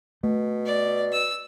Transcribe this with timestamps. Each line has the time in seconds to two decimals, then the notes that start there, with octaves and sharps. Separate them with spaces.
0.24 B2 A3
0.66 D5
1.12 E6